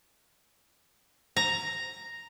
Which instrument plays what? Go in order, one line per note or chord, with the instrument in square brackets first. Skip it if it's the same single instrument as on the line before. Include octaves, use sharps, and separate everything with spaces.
[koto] A#5